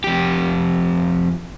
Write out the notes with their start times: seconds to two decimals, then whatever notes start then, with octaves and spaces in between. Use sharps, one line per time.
0.04 F2 G4